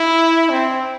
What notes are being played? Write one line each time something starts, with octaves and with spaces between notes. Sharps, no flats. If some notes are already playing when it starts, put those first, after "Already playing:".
Already playing: E4
C4